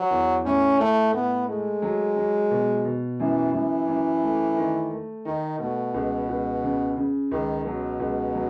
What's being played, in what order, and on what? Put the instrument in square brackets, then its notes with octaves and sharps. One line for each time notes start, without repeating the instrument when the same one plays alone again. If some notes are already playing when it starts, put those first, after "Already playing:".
Already playing: [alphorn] F#3
[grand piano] E2
[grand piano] A2 [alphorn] C#4
[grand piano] A2 [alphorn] A3
[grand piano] A2 [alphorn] B3
[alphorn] G#3 [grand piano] A3
[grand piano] F#3
F#3
B2
B2
[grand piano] F#2 [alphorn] E3
[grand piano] F#2 [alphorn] E3
[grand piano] F#2
A3
D#3
A3
[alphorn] D#3 [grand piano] D#4
[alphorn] B2 [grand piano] A3
[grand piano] C#2
C#2
C#3
C#3
[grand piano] C#2 [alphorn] D#3
[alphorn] B2 [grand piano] F#3
[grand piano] C#2
F#3